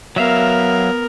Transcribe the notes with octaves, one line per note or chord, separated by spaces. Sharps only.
F#3 B3 A#4 E5 F5